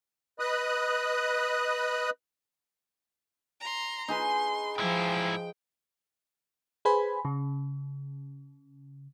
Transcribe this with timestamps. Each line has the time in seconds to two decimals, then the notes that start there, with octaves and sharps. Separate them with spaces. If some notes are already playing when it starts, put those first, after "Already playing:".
0.39 B4 D#5 B5 D#6 F#6
3.60 A#5 C6
4.08 D#4 G#4 B4 C6
4.78 G#2 F3 E4 G5
6.85 G#4 B4 C5 G#5 B5
7.25 C#3